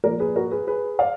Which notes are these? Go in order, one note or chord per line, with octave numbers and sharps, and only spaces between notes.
A#2 F3 A#4 D5
G#4 B4
F#4 A#4
G#4 B4
G#4 B4
D5 F5